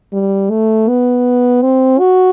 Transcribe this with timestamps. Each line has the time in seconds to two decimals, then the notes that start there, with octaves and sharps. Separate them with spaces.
0.13 G3
0.50 A3
0.88 B3
1.62 C4
1.99 F#4